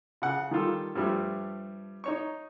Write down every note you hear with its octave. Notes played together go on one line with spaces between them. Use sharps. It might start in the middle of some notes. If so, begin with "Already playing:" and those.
C#3 F#5
D#3 G3 F4 A4
G2 F3 G3 A3
D#4 C#5 C#6